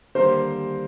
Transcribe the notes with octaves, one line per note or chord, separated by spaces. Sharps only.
D#2 D3 G3 A#3 C5